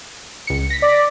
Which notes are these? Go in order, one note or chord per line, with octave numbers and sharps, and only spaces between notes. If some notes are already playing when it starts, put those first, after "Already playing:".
C#2 C#7
A#6 B6
D5